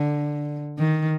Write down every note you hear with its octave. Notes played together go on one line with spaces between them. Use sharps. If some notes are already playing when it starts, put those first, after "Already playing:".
Already playing: D3
D#3